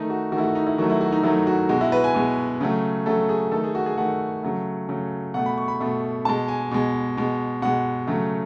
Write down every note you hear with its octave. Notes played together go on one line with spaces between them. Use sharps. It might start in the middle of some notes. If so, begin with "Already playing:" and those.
Already playing: D#3 A3 D#4
F#4
D#3 F#4
A3 E4
F#4
D#4
E4
D#3 F#3 A3 F#4
E4
F#4
D#4
D#3 F#3 A3 E4
F#4
B2 G#3 F#4
E4
B4
G#5
B2 G#3
C#3 F#3 A3
C#3 F#3 A3 A4
G#4
D#3 A3 A4
G#4
F#4
G#4
D#3 A3 F#5
C#3 F#3 A3
C#3 F#3 A3
B2 A3 F#5
B5
C#6
B5
B2 A3
B2 G#3 A5
G#5
B2 G#3
B2 G#3
B2 G#3 F#5
C#3 F#3 A3